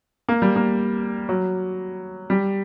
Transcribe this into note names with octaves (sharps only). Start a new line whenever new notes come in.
A#3
G3
A#3
F#3
G3